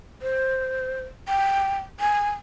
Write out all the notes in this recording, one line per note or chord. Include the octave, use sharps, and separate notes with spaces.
C5
G5
G#5